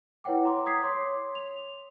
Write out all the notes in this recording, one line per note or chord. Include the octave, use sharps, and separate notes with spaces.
E4 B4 C#5 F#5 G5 D6
A#5 C6 D6
D#6 G#6 B6 C7
C#5 C6 D6
F7